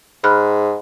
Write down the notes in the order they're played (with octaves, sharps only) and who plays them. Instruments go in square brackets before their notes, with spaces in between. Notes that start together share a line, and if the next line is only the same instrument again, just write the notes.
[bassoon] G#2 [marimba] B5 F6 F#6